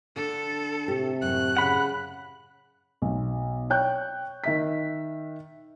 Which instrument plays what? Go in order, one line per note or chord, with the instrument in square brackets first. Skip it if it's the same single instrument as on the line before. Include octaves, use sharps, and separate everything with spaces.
[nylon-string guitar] D3 D4 [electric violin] A4
[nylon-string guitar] A2 G4 [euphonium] C3
[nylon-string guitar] F#2 A2 [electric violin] F#6
[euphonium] C#3 [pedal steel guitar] F#5 B5
[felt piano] B1
C#5 G5 F#6 G6
D#3 E5 B6